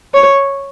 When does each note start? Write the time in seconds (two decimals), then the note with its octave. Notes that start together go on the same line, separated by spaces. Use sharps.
0.14 C#5